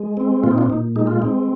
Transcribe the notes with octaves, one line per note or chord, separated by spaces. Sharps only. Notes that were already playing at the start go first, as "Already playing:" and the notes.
Already playing: G#3
C4
A#2 F4
D#4
D4 F4
A#2 D#4
G#3 D#4
F4
C4 D#4